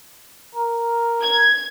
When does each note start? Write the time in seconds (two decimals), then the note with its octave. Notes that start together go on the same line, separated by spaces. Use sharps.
0.55 A#4
1.22 G#6